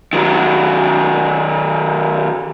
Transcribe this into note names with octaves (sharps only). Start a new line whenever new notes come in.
D#3 F#3